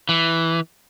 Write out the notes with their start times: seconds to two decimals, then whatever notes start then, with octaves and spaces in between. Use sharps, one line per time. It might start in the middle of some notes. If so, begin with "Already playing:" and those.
0.09 E3